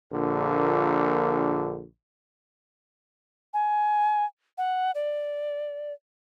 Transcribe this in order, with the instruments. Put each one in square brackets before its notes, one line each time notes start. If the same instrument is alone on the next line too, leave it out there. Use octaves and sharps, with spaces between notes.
[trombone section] A#1 A#2 D3
[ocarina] G#5
F#5
D5